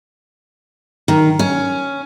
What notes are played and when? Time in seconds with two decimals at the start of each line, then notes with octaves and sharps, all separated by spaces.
1.08 D#3
1.39 C#4